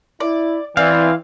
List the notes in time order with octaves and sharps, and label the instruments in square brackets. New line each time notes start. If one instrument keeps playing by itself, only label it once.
[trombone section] E4 [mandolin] D5
[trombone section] E3 [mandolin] C4 [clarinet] D5 [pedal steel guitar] F5